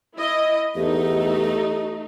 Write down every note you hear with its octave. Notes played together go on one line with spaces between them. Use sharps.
E4 D#5
E2 A3 D#4 G4